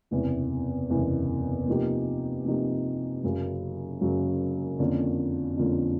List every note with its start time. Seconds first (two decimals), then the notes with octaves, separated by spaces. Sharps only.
0.11 F#1 E2 C3 E3
0.90 F#1 E2 C3 E3
1.67 C3 F3 A#3 D#4 G4
2.45 C3 F3 A#3 D#4 G4
3.23 F#1 F#2 C#3 F#3
4.01 F#1 F#2 C#3 F#3
4.79 F2 D3 F3 A#3 C#4
5.57 F2 D3 F3 A#3 C#4